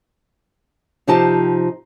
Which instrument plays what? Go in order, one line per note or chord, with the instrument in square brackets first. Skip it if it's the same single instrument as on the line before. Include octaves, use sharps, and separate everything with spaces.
[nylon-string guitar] C3 F3 D#4 G4 C5 A5